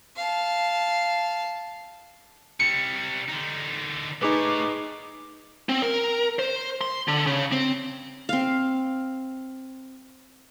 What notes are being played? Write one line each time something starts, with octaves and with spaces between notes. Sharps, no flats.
F5 A5
C3 G3 C#7
D3 D#4
A3 D#4 G#4 B4 C#5 D6
C4
A#4
C5
C6
D3
C#3
C4
C4 F5